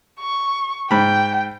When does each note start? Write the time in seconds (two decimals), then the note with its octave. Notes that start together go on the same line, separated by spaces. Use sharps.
0.20 C#6
0.91 G#2 G5 B5